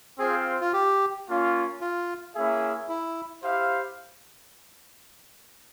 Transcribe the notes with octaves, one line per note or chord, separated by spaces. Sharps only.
C4 F4 G#4 C5 F5
F4
G4
A#3 C#4 F4
F4
A#3 C#4 E4 G#4 E5
E4
E4 G4 C5 F5